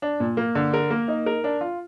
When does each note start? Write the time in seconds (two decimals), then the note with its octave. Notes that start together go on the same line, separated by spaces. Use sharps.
0.02 D4
0.20 A#2
0.37 A#3
0.55 D3
0.74 A#4
0.90 A#3
1.08 D#4
1.26 A#4
1.44 D4
1.61 F4